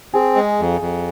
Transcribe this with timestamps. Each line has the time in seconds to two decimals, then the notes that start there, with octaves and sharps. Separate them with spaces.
0.14 C4 G#4
0.36 G#3
0.59 F2
0.81 F2